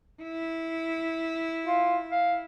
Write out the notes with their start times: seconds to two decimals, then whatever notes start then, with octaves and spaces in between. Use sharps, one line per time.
0.23 E4
1.67 F4
2.11 F5